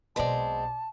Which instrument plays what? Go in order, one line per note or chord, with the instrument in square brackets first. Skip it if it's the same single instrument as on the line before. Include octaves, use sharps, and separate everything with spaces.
[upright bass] B1 B2 [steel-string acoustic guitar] G#3 C4 [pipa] B4 D5 [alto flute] A5